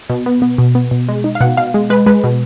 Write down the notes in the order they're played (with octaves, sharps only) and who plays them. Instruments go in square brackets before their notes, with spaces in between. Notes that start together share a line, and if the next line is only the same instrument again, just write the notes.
[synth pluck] B2
B3
B3
B2
B3
B2
G#3
D#4
F5
B2 F#5
B2 F5
G#3
G#3 B4
G#3 B4
B2